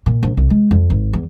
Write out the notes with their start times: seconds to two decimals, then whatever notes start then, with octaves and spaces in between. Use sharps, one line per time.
0.06 A#2
0.23 A#1
0.37 C2
0.50 G#3
0.71 F2
0.90 G#1
1.13 E2